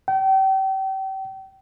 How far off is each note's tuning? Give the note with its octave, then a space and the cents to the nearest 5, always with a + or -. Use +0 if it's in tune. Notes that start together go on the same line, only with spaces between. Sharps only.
G5 -35